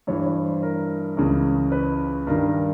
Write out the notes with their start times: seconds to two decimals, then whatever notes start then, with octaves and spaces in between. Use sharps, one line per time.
0.07 G2 E3 C#5
0.26 C#5
0.44 C5
0.63 A#4
1.17 C#2 C#3 E3
1.72 B4
2.27 G2 D#3 A#4
2.46 A#4